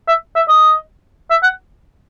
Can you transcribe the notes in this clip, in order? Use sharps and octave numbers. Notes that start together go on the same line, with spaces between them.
E5
E5
D#5
E5
F#5